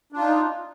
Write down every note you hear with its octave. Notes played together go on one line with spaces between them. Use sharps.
D4 D#4 F4